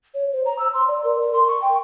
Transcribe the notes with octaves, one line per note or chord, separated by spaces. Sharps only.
C#5
C5
A#5
E6
C6
D5
A#4
A#4
C6
C#6
G5